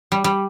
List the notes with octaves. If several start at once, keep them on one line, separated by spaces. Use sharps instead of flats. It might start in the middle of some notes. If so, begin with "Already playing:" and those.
G3
G3